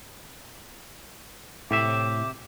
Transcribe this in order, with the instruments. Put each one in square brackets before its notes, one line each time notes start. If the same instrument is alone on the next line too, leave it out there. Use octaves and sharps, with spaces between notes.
[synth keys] A2 [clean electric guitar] C3 G4 E5 [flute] D6